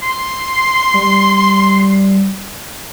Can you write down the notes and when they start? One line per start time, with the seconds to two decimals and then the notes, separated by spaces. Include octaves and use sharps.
0.03 C6
0.94 G3